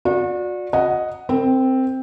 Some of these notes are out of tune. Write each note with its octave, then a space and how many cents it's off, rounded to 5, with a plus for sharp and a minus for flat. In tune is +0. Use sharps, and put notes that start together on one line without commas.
F#4 -35 D5 +0
D#5 +0 F#5 +0
C4 +0 A#4 -35